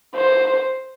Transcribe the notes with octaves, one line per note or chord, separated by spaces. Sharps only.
C5